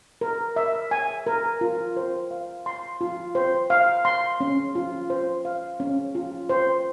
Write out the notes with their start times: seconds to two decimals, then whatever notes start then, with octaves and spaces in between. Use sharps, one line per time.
0.21 A#4
0.56 E5
0.91 G#5
1.26 A#4
1.61 F4
1.97 C5
2.31 F5
2.66 C6
3.01 F4
3.35 C5
3.70 F5
4.05 C6
4.40 C#4
4.75 F4
5.10 C5
5.45 F5
5.80 C#4
6.15 F4
6.49 C5